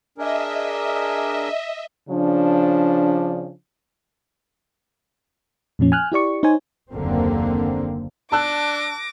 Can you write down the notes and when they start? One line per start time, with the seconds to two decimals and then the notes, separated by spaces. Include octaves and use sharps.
0.18 D4 G#4 A#4 D#5 E5
2.09 C#3 F3 D4
5.79 F2 A#2 F3 C#4
5.92 G#5 F6 F#6
6.12 E4 G4 D5 C#6
6.43 D#4 C5 C#5 G#5
6.92 F#1 D#2 D3 A#3 C4
8.32 D4 A5 D6 E6 F#6 A#6